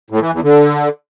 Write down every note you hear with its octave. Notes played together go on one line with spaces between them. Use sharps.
A2
E3
E2
D3